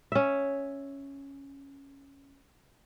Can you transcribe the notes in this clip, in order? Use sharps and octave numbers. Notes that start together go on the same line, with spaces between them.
C#4 E5